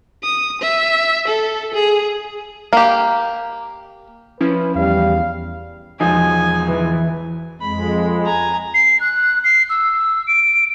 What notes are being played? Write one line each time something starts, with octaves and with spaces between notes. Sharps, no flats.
D#6
E5
A4
G#4
A#3 G4
F3 C#4 E4 B4
E2 G3 F5
E1 F3 D#4 G#5
E3
F2 G#3 B5
G#5 A#5
C7
F#6
C7
E6
D7